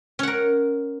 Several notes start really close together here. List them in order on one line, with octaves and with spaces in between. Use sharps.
C#4 F#5 A#4